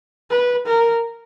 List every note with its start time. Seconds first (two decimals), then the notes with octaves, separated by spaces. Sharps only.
0.30 B4
0.66 A#4